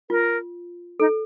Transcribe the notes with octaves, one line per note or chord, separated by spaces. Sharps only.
F4 A#4
D#4 A4